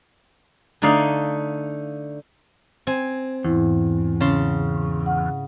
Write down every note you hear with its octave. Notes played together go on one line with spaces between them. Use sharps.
D3 A3 D#4 D5 F5
C4 G#5
E2 G#2 E4
C#3 A5 C6
F#5